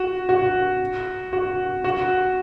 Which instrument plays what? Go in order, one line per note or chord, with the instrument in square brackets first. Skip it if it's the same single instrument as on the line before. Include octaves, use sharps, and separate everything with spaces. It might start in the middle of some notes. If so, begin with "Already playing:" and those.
Already playing: [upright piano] F#4
F#4
F#4
F#4